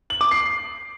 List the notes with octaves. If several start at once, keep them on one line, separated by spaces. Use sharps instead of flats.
F#7
D6
C7